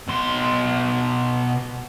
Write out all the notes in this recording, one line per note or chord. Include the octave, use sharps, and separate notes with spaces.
B2 C6